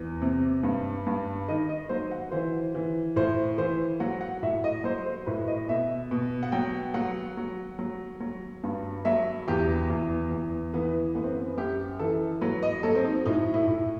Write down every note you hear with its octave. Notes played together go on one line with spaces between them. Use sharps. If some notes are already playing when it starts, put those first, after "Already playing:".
Already playing: E2
C3
G2
G2
D#3 D#5
D#5
F#3 C5
F#5
E3 C5
E3
A2 C5
E3 C5
F#3 F#5
F#5
A2 E5
D#5
F#3 C5
C5
A2 B4
D#5
B2 E5
B2
F#5
F#3 G5
F#3 F#5
F#3
F#3
F#3
G2
F#3 E5
E2 G4
E2
E2
E3 B3
F#2 B3
C4
B3
F#2 G4
E3 A4
F#3 B4
D#5
F#3 A4
C4
D#4
A2 D#4
E4
A2